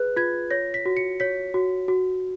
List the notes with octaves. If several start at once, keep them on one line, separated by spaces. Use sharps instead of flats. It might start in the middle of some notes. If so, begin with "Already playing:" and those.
Already playing: G#4 B4 F#6
F4 G#6
C#5 A#6
B6
F#4
C#7
C#5 B6
F#4
F#4